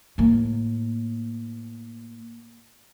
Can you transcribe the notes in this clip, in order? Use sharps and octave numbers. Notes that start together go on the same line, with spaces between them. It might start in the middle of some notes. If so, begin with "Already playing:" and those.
A2 A#3